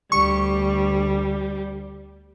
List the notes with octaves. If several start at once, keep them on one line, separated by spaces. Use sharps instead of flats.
D2 G3 C#6